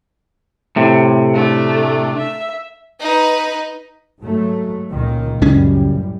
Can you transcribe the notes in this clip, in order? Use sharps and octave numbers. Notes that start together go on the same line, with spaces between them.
A2 C3
A3 D4
E5
D#4 B4
G#2 F#3 A3
C#2 A#2 D#3
C#2 F#2 A2 G3 G#3 C#4